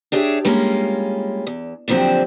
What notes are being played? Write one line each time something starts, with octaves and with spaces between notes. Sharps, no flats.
D4 G4 G#4 C#5 D#5 E5
G3 G#3 A#3 C#4 F4
E2
A#2 D3 F3 F#3 C4 G4